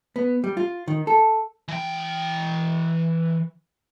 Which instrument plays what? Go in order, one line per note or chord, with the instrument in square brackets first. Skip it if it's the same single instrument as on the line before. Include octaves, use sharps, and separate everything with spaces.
[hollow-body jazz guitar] B3
G3
F4
D#3
A4
[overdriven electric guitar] E3 G5